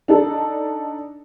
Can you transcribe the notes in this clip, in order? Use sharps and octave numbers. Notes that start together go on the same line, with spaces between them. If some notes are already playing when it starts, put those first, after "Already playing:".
D4 D#4 A4